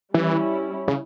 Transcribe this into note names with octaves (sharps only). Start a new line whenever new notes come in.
E3 G3 C#4 E4
C#3